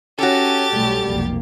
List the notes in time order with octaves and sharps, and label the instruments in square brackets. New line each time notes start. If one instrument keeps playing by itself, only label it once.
[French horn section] C#4 [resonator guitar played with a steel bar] F#4 A4 [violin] G4 A6
[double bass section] B1 A3 C#4 [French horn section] G3
[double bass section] F1 B1 A#3